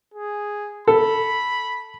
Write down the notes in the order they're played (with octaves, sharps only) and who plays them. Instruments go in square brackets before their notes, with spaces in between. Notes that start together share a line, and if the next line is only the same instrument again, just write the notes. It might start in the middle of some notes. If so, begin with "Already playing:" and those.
[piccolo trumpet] G#4
[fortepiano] A4 [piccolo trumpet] B5